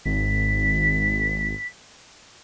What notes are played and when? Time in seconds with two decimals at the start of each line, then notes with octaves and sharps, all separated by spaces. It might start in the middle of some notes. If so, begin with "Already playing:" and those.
0.05 G#1 B6